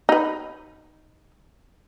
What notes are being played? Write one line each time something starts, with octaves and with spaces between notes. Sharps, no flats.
D#4 B4